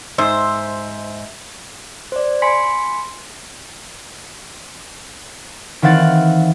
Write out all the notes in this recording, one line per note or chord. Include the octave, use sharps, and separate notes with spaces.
G#2 C5 E5
C5 D5
G#5 B5 C6 B6 C#7
D#3 E3 C4 F5 F#5 A6